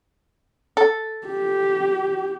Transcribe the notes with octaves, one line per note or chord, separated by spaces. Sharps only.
A4
G4